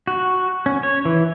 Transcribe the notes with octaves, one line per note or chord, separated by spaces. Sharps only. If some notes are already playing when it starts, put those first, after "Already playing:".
F#4
C#4
C#5
E3